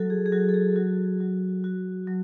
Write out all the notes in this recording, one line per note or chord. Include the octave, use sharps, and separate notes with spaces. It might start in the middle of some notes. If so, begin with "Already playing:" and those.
Already playing: F#3 F#4 A4
G#4
G#4
F#3 F#4
A4
G#4
F#3 F#4
F#3
F#4
F#3